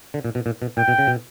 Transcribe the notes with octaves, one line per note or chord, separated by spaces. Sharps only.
D3
A#2
B2
A#2
B2
A#2 G5
B2
C#3
B2